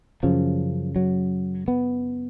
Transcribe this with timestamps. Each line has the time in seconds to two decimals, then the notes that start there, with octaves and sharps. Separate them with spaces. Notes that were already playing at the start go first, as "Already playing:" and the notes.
0.23 F#2 C#3 F3
0.96 F#3
1.68 B3